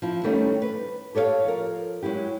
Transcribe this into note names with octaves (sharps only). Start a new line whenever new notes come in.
F3 E4
D#3 G3 A3 C4 C#4 D#4
B4
G4 A4 C#5 D5 F5
F3 A#4
F#3 G#3 E4 G4